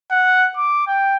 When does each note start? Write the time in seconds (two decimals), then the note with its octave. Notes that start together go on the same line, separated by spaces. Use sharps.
0.11 F#5
0.57 D6
0.87 G5